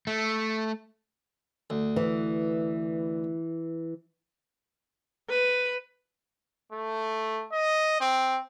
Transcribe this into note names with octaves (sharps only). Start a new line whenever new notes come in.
A3
D2
E3
B4
A3
D#5
C4